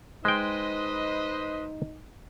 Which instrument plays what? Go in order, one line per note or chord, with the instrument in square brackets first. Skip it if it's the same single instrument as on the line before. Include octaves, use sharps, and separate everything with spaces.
[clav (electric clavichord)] G#3 G5 [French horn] D#4 [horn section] B4 C5 D#5